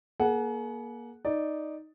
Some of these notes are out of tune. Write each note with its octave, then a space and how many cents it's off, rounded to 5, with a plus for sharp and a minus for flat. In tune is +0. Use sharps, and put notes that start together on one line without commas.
A#3 +25 G#4 +40 F#5 +0
D#4 +0 D5 +0